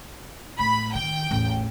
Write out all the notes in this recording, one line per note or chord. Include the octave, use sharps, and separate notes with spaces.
A2 B5
D#3 G5
A1 E2